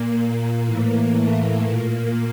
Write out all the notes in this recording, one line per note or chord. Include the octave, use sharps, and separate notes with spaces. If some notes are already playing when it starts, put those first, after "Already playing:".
Already playing: A#2 A#3
A#3
A2 E3
A3
A#2 A#3